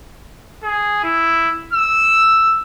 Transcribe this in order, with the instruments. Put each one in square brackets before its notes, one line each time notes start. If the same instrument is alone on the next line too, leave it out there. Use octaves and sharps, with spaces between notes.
[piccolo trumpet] G#4
E4
E6